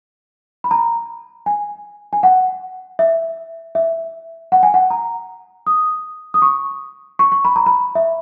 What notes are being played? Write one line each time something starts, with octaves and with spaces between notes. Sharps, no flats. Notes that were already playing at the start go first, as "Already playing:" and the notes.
B5
A#5
G#5
G#5
F#5
E5
E5
F#5
G#5
F#5
A#5
D#6
D#6
C#6
C#6
C#6
B5
A#5
B5
E5